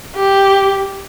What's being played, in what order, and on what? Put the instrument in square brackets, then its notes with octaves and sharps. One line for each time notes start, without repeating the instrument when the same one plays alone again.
[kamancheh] G4